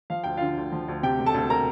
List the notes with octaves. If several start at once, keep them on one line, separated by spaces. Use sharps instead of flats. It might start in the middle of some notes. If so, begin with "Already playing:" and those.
F3 F5
D2 G5
D3 F4 F5
D2
F3
D2
C3 G4 G5
E1
A4 A5
D2
A#4 A#5